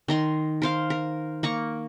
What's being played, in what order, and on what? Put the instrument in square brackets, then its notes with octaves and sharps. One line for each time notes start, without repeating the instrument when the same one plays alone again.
[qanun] D#3 A#5 C6
A#4 C5 F5
A#4
A#3 A#5 C#6